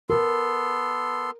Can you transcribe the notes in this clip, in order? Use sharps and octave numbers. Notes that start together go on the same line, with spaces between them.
B3 A4 A#4 C6